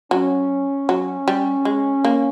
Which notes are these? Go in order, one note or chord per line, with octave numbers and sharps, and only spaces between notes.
F#3 C#4
F#3
G3
G#3
A#3